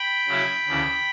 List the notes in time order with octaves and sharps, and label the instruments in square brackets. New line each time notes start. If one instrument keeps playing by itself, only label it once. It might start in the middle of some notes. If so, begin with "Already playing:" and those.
Already playing: [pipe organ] G5 B5
C#3 F#3 C#4 E4
D2 C#3 E3